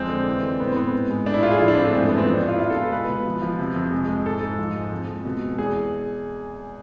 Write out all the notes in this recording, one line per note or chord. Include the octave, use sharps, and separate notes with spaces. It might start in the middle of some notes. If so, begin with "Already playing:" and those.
Already playing: F2 G#3 C4
D3
E3
G#3
A2 B3
C4
A2 B3
G#2
G#3
A2 D4
E4
A2 F4
G#4
F3 F4
D4
G#2 C4
A3
F2 G#3
A3
E3 B3
C4
F3 D4
A2
F4
E4
B2 F4
A4
G#3
B4
G#3 B4
B2
F3
F3
C3
F2
G#3
G#3
G#2 A4
G#2
F3
G#3
F2
F2
B2
G#3
E2 G#4